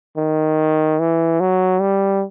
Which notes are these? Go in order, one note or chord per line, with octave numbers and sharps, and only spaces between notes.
D#3
E3
F#3
G3